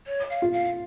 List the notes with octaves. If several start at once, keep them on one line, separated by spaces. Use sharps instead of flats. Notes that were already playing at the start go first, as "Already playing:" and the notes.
C#5
F5
F4
F5